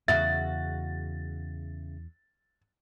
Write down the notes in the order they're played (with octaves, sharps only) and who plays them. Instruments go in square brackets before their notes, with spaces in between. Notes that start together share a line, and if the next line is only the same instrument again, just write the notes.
[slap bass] E2 [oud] C#3 F#4 E5 [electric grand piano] A6